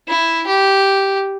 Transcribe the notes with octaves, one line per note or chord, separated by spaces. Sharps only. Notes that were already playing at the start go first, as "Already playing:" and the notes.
E4
G4